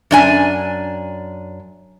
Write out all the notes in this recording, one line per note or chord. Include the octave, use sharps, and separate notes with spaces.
F#2 D4 G#5